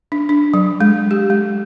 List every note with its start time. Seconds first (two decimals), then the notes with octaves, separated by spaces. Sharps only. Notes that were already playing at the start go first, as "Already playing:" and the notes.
0.12 D4
0.29 D4
0.54 F#3
0.81 G#3
1.11 G4
1.30 G#3